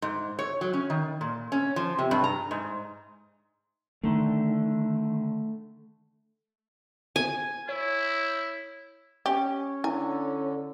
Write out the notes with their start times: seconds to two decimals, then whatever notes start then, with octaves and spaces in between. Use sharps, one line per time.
0.02 G#2
0.39 C#5
0.61 F#3
0.73 C#4
0.90 D#3
1.21 A#2
1.52 C#4
1.76 F3
1.99 C3
2.11 G2
2.24 A#5
2.51 G#2
4.03 D3 D#3 A3
7.16 G#5
7.69 E4 C#5
9.26 C#4 G4
9.84 D3 E4 G#5